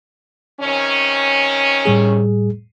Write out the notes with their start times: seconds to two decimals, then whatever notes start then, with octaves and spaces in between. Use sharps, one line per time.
0.60 C3 D#3 C#4
1.85 A2 G3 G#4